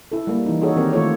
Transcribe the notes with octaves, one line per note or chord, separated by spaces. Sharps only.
E4 A4
G3 A#3
E3 D#4
D#4 F#4 G#4 A4 C#5
D#3 C4 G4 A#4
D#3 A3 F4 A4 C#5